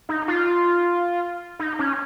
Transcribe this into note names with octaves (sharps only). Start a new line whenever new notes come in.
D#4
F4
D#4
C#4